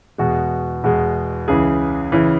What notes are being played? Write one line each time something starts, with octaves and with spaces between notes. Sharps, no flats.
E2 B2 G#3 F#4
E2 B2 G#3
C#2 C#3 E3 G#4
C#3 E3